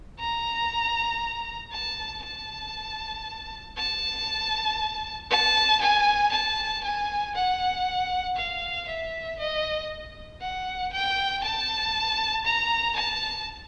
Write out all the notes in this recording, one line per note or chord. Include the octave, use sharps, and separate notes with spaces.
A#5
A5
A5
A5
A5
G#5
A5
G#5
F#5
F5
E5
D#5
F#5
G5
A5
A#5
A5